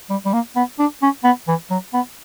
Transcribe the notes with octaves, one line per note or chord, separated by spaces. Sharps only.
G3
G3
A#3
B3
D4
C#4
B3
E3
F#3
B3